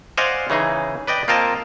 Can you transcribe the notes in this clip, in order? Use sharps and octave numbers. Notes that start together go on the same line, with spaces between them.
C5 D5 D#5 F5 F#5 G#5
C#3 E3 D#4 G#4
B4 D5 D#5 G5
A#3 C4 F4 A#4 D#5 A5